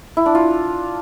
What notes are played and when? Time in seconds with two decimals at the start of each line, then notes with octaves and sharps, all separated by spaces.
0.17 E4
0.26 D4
0.35 F4